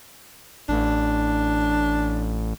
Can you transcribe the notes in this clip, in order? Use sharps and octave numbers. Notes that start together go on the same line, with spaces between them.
A1 D4